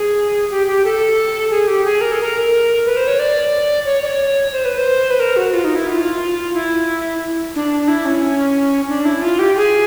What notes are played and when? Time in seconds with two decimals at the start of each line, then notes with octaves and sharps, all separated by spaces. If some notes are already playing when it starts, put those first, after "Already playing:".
Already playing: G#4
0.50 G4
0.67 G4
0.84 A4
1.50 G#4
1.67 G4
1.85 G#4
2.01 A#4
2.12 A4
2.21 A#4
2.86 B4
2.97 C5
3.07 C#5
3.19 D5
3.85 C#5
4.03 D5
4.06 C#5
4.53 C5
4.65 B4
4.77 C5
5.11 B4
5.20 A#4
5.36 F#4
5.53 F4
5.65 D#4
5.75 E4
5.87 F#4
5.92 F4
6.54 E4
7.55 D4
7.88 E4
8.05 C#4
8.89 D4
9.05 E4
9.22 F4
9.39 G4
9.56 G#4